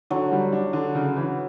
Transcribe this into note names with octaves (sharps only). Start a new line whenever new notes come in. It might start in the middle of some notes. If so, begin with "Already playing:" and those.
D3 F#3
G3
D4
D3
C#3
E3